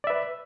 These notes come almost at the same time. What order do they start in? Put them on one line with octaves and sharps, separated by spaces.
D5 E5 B4